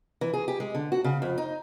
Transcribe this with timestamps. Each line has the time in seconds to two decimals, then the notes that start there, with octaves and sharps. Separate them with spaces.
0.21 E3
0.33 G#4
0.48 G4
0.60 G#3
0.75 D3
0.92 F#4
1.04 C#3
1.22 F2
1.38 D#4